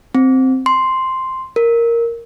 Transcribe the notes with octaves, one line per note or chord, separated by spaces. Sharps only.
C4
C6
A#4